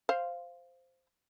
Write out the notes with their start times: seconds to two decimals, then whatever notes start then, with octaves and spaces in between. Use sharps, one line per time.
0.09 C5 F5